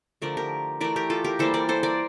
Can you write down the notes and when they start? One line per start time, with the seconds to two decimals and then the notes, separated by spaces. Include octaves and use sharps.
0.22 D3 F3 A3 A#4 D5
0.37 G4 A#4
0.81 E3 A3 A#4 D5
0.96 G4 A#4
1.10 F4 A4
1.24 G4 A#4
1.39 E3 G3 A#3 A4 C5
1.54 A#4 D5
1.69 A4 C5
1.83 A#4 D5